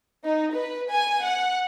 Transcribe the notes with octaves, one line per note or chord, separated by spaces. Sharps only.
D#4
B4
G#5
F#5